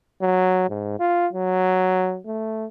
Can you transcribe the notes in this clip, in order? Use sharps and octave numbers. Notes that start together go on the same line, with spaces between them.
F#3
G#2
F4
F#3
A3